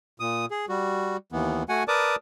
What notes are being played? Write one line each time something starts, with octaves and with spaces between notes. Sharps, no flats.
A#2 D#6
G#4
G3 F#4
D#2 E3 B3
A3 F#4 F#5 G#5
A#4 B4 D5 A5 D6 D#6